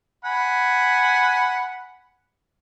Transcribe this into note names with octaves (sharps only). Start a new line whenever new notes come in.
F#5 G#5 B5